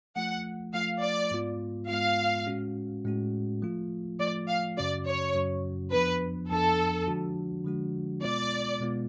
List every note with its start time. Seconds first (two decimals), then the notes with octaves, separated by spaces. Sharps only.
0.16 F3 A3 F4 F#5
0.74 F3 A3 F4 F5
1.03 D5
1.31 G#2 G#3 B3 F4
1.89 G#2 G#3 B3 F4 F5
2.47 A2 G#3 C#4 F#4
3.05 A2 G#3 C#4 F#4
3.62 F3 A3 F4
4.19 F3 A3 F4 D5
4.48 F5
4.77 F#2 C#3 F#3 C#4 F#4 D5
5.06 C#5
5.35 F#2 C#3 F#3 C#4 F#4
5.92 F2 F3 B3 D4 B4
6.50 F2 F3 B3 D4 A4
7.07 D3 F3 G#3 D4 F#4
7.65 D3 F3 G#3 D4 F#4
8.22 B2 G#3 B3 F4 D5
8.80 B2 G#3 B3 F4